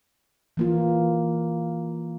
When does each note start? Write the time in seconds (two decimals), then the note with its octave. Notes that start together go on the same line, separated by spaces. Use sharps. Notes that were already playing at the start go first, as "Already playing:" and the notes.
0.57 E3 A#3 F4